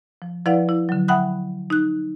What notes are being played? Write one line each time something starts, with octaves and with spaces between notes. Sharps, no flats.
F3
F3 E4 B4 D5 F5 F#5
E4
D3 F#3
E5 F#5 G5 B5 D#6 F#6
D#4 F#6